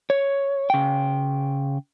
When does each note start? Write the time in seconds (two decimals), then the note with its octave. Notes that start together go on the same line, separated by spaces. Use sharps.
0.10 C#5
0.70 C#3 G5